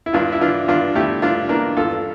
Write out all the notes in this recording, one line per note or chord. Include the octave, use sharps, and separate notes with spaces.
E4
G2 D4 F4
E4
E3 D4 F4
G2 D4 F4
A3 E4 G4
G2 D4 F4
E3 A#3 D4
G2 F4 A4